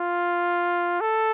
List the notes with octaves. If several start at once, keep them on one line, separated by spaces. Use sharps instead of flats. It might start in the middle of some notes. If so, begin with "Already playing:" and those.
Already playing: F4
A4